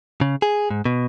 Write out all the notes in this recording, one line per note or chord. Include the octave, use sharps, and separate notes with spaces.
C#3
G#4
G#2
B2